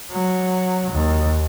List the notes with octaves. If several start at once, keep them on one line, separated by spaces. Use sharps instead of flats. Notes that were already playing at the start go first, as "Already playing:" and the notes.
F#3
D#2